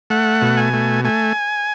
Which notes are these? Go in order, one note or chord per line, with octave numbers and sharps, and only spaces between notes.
A3 F#5
B2
G#5
A3
A3 G#5